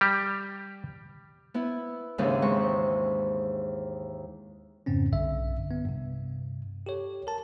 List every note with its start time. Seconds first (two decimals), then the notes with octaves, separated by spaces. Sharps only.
0.01 G3 G4
1.54 B3 E4
2.18 D#2 G#2 C#3 E3 D4
2.42 G#3 C4 C#6
4.86 F2 G#2 C#3 C4 C#4
5.12 B1 G2 D3 E5
5.71 B3
5.85 G2 C3
6.86 G4 A4 C#5
7.27 A#4 A5